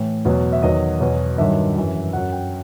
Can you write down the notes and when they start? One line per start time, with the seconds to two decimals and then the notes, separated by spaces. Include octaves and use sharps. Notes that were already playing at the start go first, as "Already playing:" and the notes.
Already playing: A2 E3
0.25 E2 B2 F#3
0.53 E5
0.63 E2 D#3 F#3 D#5
1.00 E2 B2 F#3
1.38 G2 D#3 F#3 E5
1.76 F#2 E3
2.13 F#2 F#3 F#5
2.32 G5